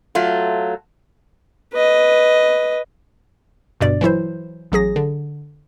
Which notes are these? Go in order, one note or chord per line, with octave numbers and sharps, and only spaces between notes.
F#3 A3 F4
B4 D#5
G1 G2 B2 D5
E3 F#3 E4 C5
A1 F#3 G#4 A#6
D3